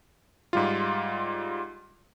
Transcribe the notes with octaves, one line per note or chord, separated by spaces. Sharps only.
G#2 G3 F4